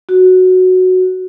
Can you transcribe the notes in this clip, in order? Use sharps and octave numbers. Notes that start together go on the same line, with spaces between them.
F#4